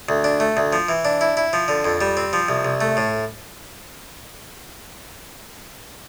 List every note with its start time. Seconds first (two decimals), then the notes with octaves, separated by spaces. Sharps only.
0.09 D2
0.24 D4
0.40 A3
0.57 D2
0.73 F3
0.89 E3
1.05 D4
1.21 E4
1.37 E4
1.53 F3
1.68 D3
1.84 F2
2.01 G3
2.17 C4
2.33 F3
2.49 C2
2.65 C2
2.81 A3
2.97 A2